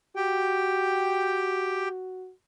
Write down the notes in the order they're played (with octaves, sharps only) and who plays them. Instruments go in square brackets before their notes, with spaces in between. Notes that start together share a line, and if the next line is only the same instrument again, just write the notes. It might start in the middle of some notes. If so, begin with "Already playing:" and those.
[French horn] F#4 [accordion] G4 G5